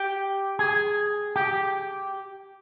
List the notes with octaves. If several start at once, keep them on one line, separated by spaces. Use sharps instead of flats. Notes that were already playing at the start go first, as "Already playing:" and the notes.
Already playing: G4
G#4
G4